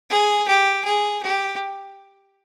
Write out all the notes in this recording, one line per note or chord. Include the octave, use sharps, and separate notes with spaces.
G#4
G4
G#4
G4